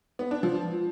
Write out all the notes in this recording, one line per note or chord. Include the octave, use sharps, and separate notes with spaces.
B3
D4
F3